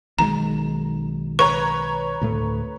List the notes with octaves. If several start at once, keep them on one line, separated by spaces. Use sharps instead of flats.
B1 D#3 G#3 A#5
B4 C#5 A#5 C#6
D2 A2 A3